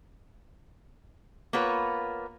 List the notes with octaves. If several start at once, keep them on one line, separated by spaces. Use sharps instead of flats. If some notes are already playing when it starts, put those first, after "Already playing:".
A#3 B3 F4 B4 C#5